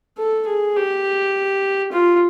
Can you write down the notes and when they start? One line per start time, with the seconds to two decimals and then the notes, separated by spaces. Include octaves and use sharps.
0.18 A4
0.47 G#4
0.76 G4
1.92 F4